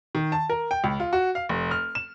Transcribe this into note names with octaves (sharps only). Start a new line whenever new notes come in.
D#3
A5
A#4
G5
C#2
F4
F#4
F5
F1
F6
E7